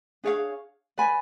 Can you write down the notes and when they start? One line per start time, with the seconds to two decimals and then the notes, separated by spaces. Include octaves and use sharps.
0.24 D4 G#4 C#5 F5
0.98 B4 D5 G#5 B5